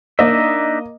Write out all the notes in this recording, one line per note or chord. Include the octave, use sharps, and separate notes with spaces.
A#3 D4 D#4 D#5 E5